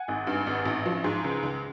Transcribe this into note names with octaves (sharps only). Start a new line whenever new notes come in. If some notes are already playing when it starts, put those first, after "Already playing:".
Already playing: F#5 G#5
G#1
G2
G#1
A1
F3
G#2
C#2
C#2